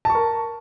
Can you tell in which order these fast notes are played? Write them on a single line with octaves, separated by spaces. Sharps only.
A5 C#6 A#4